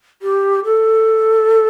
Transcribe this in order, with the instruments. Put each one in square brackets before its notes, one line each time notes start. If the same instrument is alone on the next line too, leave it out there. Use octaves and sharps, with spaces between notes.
[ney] G4
A4